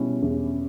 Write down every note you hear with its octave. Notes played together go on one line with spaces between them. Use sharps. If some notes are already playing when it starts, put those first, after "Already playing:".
Already playing: B2 G3 C#4 E4
E2